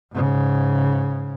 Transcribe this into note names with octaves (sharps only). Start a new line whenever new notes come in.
G#2 C#3